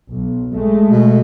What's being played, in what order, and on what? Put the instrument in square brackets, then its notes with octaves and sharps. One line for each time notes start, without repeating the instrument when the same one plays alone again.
[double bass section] B1
G#3 A3
[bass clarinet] B2